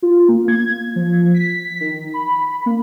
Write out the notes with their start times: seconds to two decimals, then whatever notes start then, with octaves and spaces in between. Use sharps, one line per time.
0.02 F4
0.28 A#3
0.48 G#6
0.96 F3
1.34 B6
1.80 D#3
2.14 B5
2.66 A#3